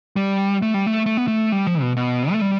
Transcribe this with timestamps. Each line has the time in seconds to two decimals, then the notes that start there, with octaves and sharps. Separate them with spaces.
0.16 G3
0.62 A3
0.74 G3
0.87 A3
1.06 A3
1.17 B3
1.28 A3
1.52 G3
1.67 F3
1.81 B2
1.97 B2
2.32 A3
2.41 G3